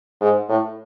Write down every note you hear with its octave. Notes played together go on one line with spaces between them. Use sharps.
G#2
A2